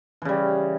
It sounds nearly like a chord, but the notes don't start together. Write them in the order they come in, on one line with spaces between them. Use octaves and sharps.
E3 C#3 G3